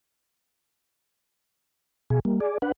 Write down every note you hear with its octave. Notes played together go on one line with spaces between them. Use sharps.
B2 G#4
G3 A#3
G#4 D5
D4 B4 F#5